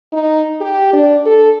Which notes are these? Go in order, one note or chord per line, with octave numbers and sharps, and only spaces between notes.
D#4
G4
D4
A4